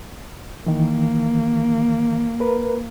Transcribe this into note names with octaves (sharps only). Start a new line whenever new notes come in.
D#3 E3 A#3
A#4 B4